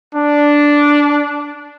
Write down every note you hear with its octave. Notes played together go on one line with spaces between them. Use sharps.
D4